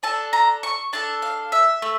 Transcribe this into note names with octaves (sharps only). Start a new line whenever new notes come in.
D4 A4 A5
A#5
C#6
D4 A4 A5
F5
E5
A3